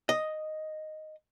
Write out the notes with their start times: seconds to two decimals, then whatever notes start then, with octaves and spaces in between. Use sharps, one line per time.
0.09 D#5